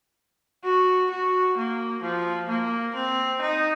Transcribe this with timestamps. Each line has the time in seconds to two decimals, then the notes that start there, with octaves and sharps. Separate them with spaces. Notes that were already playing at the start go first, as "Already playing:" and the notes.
0.64 F#4
1.11 F#4
1.57 A#3
2.02 F3
2.48 A#3
2.95 C4
3.41 D#4